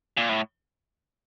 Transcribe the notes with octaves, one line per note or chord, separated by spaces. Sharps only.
A#2
A2